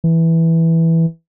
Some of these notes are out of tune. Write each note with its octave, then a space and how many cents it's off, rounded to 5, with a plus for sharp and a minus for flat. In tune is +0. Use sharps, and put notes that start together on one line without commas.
E3 -5